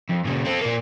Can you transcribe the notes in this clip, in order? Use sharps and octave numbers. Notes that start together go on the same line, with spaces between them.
F2
A#2 C#3
C4 A4
A#2 A#3